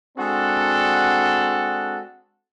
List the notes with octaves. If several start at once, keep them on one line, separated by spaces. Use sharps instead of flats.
G#3 C4 D4 F#4 A4 F#5